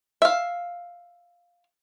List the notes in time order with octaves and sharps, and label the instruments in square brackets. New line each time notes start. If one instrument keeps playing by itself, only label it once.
[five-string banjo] E5 F5